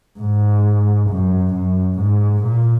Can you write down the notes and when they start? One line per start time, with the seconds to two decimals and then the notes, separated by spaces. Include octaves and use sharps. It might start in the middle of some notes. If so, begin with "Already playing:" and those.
0.19 G#2
1.10 F#2
1.54 F#2
1.99 G#2
2.44 A#2